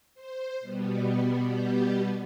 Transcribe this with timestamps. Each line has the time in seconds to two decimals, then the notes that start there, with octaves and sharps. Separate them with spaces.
0.15 C5
0.60 B2 G3 B3
1.53 G4